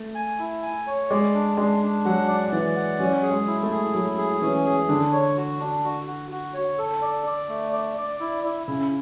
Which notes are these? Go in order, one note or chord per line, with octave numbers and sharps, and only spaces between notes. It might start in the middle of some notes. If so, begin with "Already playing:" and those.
Already playing: A3
G#5
E4
G#5
C#5
G#3 D5
D4
G#3 D4
D4
F#3 F#5
D5
E3 D5
F#5
F#3 C#4
G#4
G#3
E4
A3
G#4
F#3 E4
G#4
E3 C#4
G#4
D3 D4
C#5
F#4
D4
F#4
F#4
F#4
C#5
A4
D5
D5
A3
D5
D5
E4
E4
C#3 E4